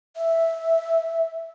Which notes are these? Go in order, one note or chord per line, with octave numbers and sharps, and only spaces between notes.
E5